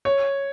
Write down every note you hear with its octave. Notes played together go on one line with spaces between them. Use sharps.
C#5